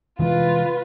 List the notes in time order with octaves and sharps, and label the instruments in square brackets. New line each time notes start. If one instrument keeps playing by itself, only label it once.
[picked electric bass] C3 E3 G#3 [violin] F4 B4